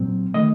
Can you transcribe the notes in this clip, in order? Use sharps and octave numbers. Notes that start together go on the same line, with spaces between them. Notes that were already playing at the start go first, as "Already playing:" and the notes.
Already playing: A#2 F#3 C4
D#3 A3 D#5